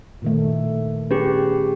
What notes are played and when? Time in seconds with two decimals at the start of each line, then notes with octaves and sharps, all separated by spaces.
0.22 A#2 D#3 A3
1.11 C#4 G4 G#4 B4